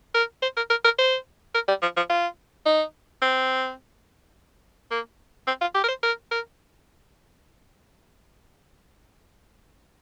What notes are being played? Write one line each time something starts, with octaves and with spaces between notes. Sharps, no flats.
A#4
C5
A#4
A#4
A#4
C5
A#4
G3
F3
F3
F4
D#4
C4
A#3
C4
F4
G4
A#4
C5
A#4
A#4